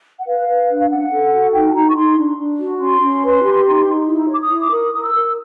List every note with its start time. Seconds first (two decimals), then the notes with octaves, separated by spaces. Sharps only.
0.19 F#5
0.26 B4 F5
0.48 B4
0.69 D4
0.78 F5
0.90 C#4 F#5
1.12 A4
1.33 F#4
1.53 D#4 G5
1.70 A5
1.74 D#4 A#5
1.89 C#6
1.95 D#4 C6
2.18 D4
2.37 D4
2.59 F#4
2.80 C#4 C6
3.01 C#4
3.23 B4
3.43 G4
3.65 D#4
3.87 D#4
4.08 E4
4.29 C#5 D6
4.40 D#6
4.49 E4
4.61 D6
4.71 A#4 D#6
4.92 A#4 D#6
5.03 E6
5.13 A#4